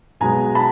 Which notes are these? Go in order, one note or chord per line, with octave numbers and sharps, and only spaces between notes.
B1 B2 G#3 B3 G#5 A#5
A5 B5